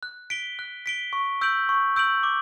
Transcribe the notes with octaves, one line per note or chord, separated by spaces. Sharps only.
F#6
B6 D7 G7
F#6
B6 D7 G7
C#6
E6 G6 D7 F#7
C#6
E6 G6 D7 F#7
D6